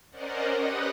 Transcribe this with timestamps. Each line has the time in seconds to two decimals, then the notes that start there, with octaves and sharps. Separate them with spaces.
0.11 C#4 A#4 C5 D5 D#5 F#5
0.57 G4 B4 D#5 F#5 D#6 F#6